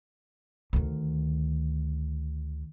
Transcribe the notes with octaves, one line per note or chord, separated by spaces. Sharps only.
D2 D#3